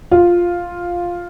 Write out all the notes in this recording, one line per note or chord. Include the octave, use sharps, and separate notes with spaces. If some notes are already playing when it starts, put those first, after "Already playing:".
F4